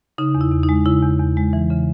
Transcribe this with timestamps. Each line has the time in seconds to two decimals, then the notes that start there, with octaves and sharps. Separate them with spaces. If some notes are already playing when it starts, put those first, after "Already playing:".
0.18 C#3 D#4
0.35 E2
0.41 E4
0.52 E2
0.63 D#4
0.69 G#3
0.86 C#3 E4
1.03 E2
1.20 E2
1.37 G#3
1.53 E3
1.70 C#3